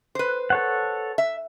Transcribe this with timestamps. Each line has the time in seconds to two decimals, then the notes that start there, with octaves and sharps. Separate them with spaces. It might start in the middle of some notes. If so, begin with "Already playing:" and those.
0.15 B4 C5
0.50 A4 C#5 F#5
1.18 E5